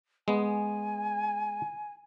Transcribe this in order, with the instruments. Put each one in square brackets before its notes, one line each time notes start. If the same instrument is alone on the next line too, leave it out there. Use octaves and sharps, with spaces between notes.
[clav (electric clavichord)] G#3 B3 [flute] G#5